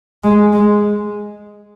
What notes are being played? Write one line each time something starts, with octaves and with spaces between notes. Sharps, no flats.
G#3
G#3